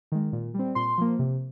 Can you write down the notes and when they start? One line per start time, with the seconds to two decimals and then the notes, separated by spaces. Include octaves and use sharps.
0.12 D#3 G#3
0.33 A#2
0.54 G3 C4
0.75 A#2 C6
0.98 F3 A#3
1.19 C3